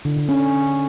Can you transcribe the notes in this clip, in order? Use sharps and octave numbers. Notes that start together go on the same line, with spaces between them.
D3
D3
C#4